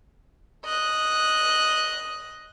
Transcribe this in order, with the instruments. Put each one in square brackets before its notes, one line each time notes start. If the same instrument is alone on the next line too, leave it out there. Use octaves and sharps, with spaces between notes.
[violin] D#5 F#6